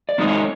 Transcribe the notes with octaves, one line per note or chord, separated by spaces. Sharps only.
D5
G#3 C4 D#4
C#5